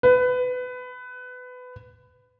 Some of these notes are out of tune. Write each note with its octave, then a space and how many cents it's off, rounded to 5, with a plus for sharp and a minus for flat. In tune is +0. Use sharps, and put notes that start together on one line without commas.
B4 +20